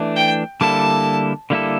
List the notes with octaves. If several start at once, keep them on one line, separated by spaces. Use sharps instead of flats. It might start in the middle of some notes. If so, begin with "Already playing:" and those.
Already playing: E3 A3 D4
G5
D3 G3 A#3 E4 A4 A5
D3 G3 A#3 E4 A4